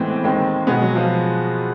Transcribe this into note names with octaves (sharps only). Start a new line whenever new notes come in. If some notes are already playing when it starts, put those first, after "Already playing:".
Already playing: A2 E3 G#3 B3 C4 C5
D#2 D#3 G#3 C4
B2 G#3 B3 G#4
F#3 F#4
F3 F4